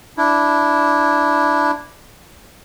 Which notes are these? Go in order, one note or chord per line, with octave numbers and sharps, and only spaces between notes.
D4 E4